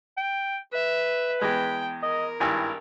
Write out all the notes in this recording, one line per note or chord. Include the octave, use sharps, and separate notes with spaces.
G5
B4 E5
E2 G#3 G5
A#4 D#5
G#1 G2 E4 G#5